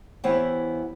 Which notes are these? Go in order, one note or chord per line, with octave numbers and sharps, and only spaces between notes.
E3 B3 E4 G4 C5 C#5